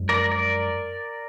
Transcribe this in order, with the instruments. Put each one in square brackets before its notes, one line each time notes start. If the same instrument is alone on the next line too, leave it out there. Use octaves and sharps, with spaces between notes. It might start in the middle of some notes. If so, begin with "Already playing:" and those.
Already playing: [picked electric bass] F#2 F3 G#3 D4
[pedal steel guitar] A#4 D5
A#4 D5